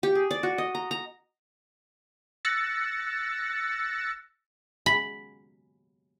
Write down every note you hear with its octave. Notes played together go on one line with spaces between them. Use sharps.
G4
G#4
D5
F#4
D#5
A#5
A#5
E6 F#6 A6 A#6 C#7
B5